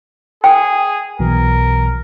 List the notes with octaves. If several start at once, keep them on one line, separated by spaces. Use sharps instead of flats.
G#4 G5
B1 B2 E3 A#4